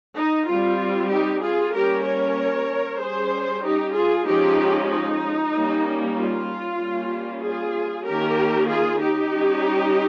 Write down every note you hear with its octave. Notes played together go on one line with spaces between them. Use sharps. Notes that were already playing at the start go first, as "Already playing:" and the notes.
D#4
G3 C4 F4
D#4 G4
F4 G#4
G3 A#3 C#4 G4 A#4
A#4 C#5
G3 C#4 G#4 C5
D#4 G4
F4 G#4
F3 G#3 C#4 D#4 G4
D#4
G3 A#3 C#4
F4
G3 A#3 C#4
F4 G#4
D#3 A#3 C#4 G4 A#4
F4 G#4
D#4 G4
G3 C#4